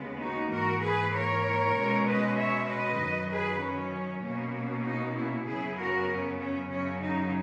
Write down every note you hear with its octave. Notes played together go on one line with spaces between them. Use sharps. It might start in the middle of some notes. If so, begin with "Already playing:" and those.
Already playing: D#2 C#3 G#3 B3
D#4 F#4
G#2 E3 A#3 F#4 A#4
G#4 B4
A#4 C#5
B2 G#3 C#4
B4 D#5
C#5 E5
B4 D#5
F#2 D#3 F#3
G#4 B4
C#4
B2 A#3 C#4
D#4
C#4 E4
F#2 C#3 F#3 B3 E4 G#4
F#4 A#4
C#4
C#4
F#2 C#3 F#3 C#4
D#4